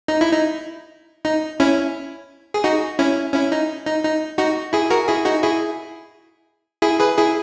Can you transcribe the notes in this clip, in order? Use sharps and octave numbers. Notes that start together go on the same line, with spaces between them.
D#4
E4
D#4
D#4
C#4 E4
G#4
D#4 F#4
C#4 E4
C#4 E4
D#4
D#4
D#4
D#4 F#4
E4 G#4
F#4 A#4
E4 G#4
D#4 F#4
E4 G#4
E4 G#4
G#4 B4
E4 G#4